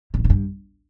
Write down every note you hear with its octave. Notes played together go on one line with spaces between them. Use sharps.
A#2
A2
A#2
G2